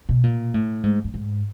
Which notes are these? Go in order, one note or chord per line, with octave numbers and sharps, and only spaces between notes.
B2
A#2
A2
G#2
G2
G#2